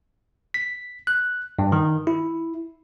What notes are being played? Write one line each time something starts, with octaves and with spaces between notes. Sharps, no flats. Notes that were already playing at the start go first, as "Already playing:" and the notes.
B6
F#6
G2
D#3
E4